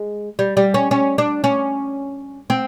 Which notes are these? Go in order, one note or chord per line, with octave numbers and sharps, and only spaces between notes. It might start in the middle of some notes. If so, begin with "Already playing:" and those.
Already playing: G#3
G3
G3
C#4
C#4
D4
C#4
C4